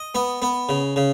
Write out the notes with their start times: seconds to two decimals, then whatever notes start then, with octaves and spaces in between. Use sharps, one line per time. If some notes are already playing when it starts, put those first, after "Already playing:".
Already playing: D#5
0.15 B3
0.42 B3
0.69 C#3
0.96 C#3